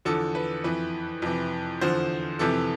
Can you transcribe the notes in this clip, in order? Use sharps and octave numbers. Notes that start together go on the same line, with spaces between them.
E2 D3 F3 A4
B4
F2 E3 B4
F2 C3 E3
E2 D3 F3 C5
F2 C3 E3 A4